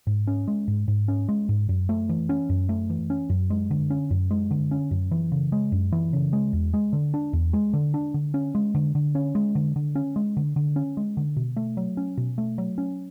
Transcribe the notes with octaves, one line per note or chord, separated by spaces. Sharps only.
G#2
C#4
G#3
G#2
G#2
C#4
G#3
G#2
F#2
A3
E3
C#4
F#2
A3
E3
C#4
F#2
G#3
D3
C#4
F#2
G#3
D3
C#4
F#2
E3
C#3
G#3
F#2
E3
C#3
G#3
E2
G#3
D3
D4
E2
G#3
D3
D4
D3
C#4
G#3
D3
D3
C#4
G#3
D3
D3
C#4
G#3
D3
D3
C#4
G#3
D3
B2
A3
F#3
C#4
B2
A3
F#3
C#4